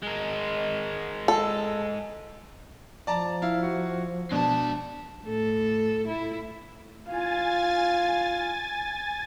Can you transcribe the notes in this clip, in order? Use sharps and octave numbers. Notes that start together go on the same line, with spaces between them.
G#3 A#4
A4
F3 D5 A5 A#5
E4 F5
F#4
B2 G#3 D4 A5
A2 A4
E4
F4 F5 G#5 A6